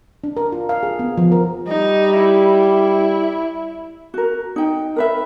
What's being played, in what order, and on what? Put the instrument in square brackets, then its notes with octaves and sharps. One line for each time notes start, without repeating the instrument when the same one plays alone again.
[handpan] D4
A#4
F4
F5
G#4
B3
F3
A#4
[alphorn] G3 [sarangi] D#4
[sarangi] E4
[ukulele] F#4 A#4
D#4 G5
A#4 B4 E5